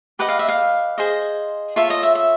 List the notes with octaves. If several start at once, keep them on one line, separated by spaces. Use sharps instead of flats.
G4 B4 D#5 F#5
F5
E5
F5
G#4 C5 D#5
F4 A4 C#5 E5
D#5
E5
E5